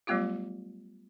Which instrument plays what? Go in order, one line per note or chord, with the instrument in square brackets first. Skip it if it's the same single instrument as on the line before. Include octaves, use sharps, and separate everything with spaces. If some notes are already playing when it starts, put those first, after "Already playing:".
[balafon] F#3 G3 A3 B3 F4 G4